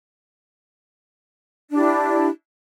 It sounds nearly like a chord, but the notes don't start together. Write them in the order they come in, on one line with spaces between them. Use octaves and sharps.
D4 G4 E4